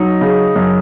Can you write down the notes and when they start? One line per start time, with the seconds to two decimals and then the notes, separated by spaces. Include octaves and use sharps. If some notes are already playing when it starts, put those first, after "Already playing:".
Already playing: F#3 D#4
0.21 C#3
0.56 F#2